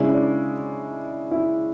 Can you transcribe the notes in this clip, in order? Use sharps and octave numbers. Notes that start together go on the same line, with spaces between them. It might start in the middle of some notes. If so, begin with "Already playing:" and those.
Already playing: C#3 G#3 C#4 D4 E4
D4
E4